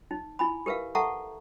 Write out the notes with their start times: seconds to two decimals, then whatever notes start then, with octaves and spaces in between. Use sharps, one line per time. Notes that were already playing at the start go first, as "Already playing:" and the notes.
0.11 D#4
0.39 E4 G#5 B5
0.66 G4 A#4 B4 E5 F5
0.95 A4 E5 F#5 A5 A#5 C#6